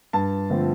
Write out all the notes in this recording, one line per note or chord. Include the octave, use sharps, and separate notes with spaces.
G2 A5
D3 F3 A3 C4